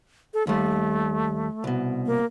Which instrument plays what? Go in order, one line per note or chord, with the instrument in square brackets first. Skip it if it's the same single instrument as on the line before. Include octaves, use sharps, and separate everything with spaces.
[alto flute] A4
[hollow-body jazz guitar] D#2 G3 [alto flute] A3
[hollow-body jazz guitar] C2 B2
[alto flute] A#3